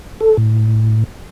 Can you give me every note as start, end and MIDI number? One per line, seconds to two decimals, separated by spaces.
0.21 0.37 69
0.37 1.04 45